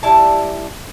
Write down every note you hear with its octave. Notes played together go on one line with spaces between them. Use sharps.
G3 E4 A5